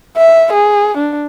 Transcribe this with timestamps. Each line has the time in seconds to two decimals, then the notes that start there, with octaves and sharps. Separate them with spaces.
0.17 E5
0.53 G#4
0.98 D4